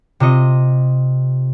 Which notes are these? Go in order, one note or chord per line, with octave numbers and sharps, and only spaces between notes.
C3 F4 D#5 C#7